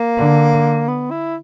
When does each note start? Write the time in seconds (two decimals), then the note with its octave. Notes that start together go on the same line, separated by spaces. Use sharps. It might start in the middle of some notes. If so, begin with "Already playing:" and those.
Already playing: A#3
0.18 D3
0.88 B3
1.11 E4